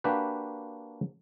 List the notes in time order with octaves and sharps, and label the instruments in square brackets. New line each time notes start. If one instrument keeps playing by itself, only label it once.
[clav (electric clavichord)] A#3 D4 F#4 G4 B4